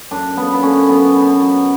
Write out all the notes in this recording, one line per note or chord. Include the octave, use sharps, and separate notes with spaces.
F#2 D4
F#2 B3
B3
D3 C#4
F#3 B3
B2
F#3